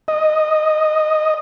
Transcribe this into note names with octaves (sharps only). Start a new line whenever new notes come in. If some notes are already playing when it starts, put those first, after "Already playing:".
D#5